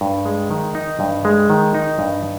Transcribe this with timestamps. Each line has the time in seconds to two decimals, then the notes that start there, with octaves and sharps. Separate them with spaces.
0.01 G2
0.25 G#3
0.51 D#3
0.75 D#4
1.00 G2
1.25 G#3
1.50 D#3
1.74 D#4
1.99 G2